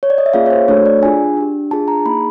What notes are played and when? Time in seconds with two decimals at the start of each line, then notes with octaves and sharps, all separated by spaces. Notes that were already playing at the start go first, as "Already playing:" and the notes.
0.03 C#5
0.10 D5
0.18 D#5
0.26 E5
0.34 A#3 C#4 F4 G#4 F5
0.46 C#5
0.50 C5
0.68 A3 D4 F#4 A4 C#5
0.86 D5
1.02 D4 F4 G#4 G#5
1.37 D4 G4
1.71 D4 F4 G#4 A5
1.88 A#5
2.05 A#3 D#4 G#4 B5